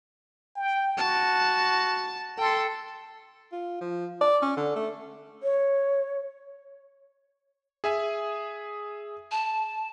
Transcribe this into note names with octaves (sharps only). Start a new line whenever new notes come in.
G5
F#4 A5
A4 G5 C6
F4
F3
D5
C#4
D3
A3
C#5
G#4 E5 G#5
A5